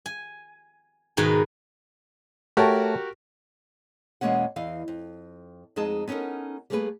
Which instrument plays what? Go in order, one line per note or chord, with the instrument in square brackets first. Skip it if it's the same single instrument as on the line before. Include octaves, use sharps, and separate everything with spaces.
[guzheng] G#5
G#2 B2 D#3 G#3 B4 G#5
[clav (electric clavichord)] A3 C#5 A5 [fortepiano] F#4 G4 A#4
[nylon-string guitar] E2 B2 G#3 A#3 C#4 F#5
E2 E3 D#5 F5
F2
F2 G#3 D#4 G#4 A5
B3 C#4 D#4 A4 A#4
G3 A3 A#3 G#4 A#4 B4